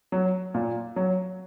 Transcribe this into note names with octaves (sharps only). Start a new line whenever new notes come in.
F#3
A#2
F#3